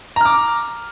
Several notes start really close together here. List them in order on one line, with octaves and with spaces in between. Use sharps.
A#5 F6 D6